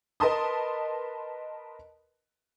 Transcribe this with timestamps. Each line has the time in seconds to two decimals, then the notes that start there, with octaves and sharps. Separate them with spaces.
0.20 A#4 B4 D#5 A5 C6 D#6